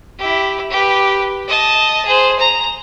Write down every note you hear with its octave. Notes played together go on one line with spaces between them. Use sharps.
E4 G4
G4 B4
D#5 A5
G#4 C5
A#5